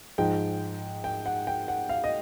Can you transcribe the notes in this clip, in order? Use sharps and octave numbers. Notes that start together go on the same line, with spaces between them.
G#2 F3 G5
G5
F#5
G5
F#5
F5
D#5